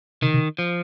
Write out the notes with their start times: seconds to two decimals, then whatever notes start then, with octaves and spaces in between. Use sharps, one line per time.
0.22 C3 D#3
0.34 C3
0.59 F3